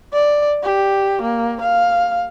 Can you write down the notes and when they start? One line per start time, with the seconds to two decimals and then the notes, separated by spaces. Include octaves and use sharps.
0.13 D5
0.63 G4
1.22 A#3
1.62 F5